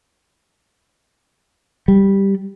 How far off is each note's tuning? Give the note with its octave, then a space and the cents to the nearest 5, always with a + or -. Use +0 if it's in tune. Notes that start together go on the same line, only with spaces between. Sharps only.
G3 +0